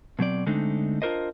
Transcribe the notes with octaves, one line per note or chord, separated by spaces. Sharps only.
B2 F#3 C4 D5
D3 G#3 A3 C4 D4 D#4
D4 F4 G4 A#4 C5 D#5